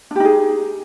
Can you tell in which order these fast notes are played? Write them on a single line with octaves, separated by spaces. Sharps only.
D4 G4 D#4 G#4